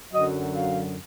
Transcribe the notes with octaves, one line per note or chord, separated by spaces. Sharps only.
F#2 D3 F#3 D#5
F5